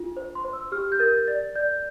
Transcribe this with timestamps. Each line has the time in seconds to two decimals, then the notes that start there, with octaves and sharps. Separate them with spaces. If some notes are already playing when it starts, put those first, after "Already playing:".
Already playing: D4 F4
0.17 C5
0.35 C6
0.44 C5
0.53 E6
0.72 G4 F6
0.92 G6
1.00 A#4 A6
1.28 D5 A6
1.55 D5 G6